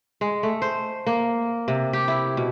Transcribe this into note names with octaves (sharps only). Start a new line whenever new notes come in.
G#3
A3
C5
A#3
C3
G4
E4
B2